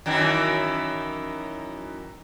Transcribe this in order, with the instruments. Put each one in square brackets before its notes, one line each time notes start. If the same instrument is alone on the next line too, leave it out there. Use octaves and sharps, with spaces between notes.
[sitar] F#2 D#3 E3